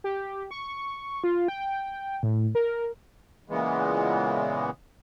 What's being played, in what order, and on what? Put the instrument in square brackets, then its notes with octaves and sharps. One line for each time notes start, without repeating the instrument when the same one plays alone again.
[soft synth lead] G4
C#6
F4
G5
A2
A#4
[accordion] A#2 C#3 E3 G#3 B3